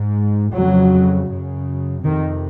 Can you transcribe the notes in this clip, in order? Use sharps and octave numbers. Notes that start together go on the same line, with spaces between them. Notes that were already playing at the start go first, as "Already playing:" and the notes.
Already playing: G#2
F2 C#3 F#3
F#2 C#3
F2 C3 D#3